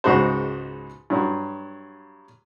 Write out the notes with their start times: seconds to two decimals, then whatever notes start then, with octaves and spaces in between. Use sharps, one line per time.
0.04 C#2 G#2 D#4 F#4 C5
1.10 G2 F#3